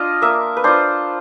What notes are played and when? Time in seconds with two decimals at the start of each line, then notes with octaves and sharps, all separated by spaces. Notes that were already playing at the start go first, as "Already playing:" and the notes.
Already playing: D4 F4 D#5
0.22 A#3 E5
0.57 B4
0.64 D4 F4 C5